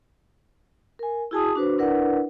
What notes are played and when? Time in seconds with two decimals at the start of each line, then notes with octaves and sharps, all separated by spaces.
0.99 A#4 G#5
1.31 E4 F#4 G#4 G#5 A5 D#6
1.55 D4 F#4 B4 C5
1.78 D4 E4 A#4 B4 D5 F#5